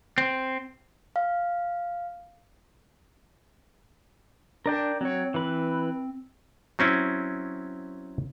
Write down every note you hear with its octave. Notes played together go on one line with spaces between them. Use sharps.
C4
F5
D4 A#4 D5 G5
F#3 C4 C#5
E3 B4
F#3 C4 C#4 E4